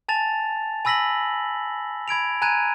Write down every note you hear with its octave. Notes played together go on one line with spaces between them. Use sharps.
G#5 A5 A6 F7
G#5 B5 E6 A#6 B6 F#7
B5 G#6 D7 F7
G#5 A#5 F#6 G#6 D#7